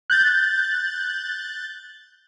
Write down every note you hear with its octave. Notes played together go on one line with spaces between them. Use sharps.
F#6 G6 A6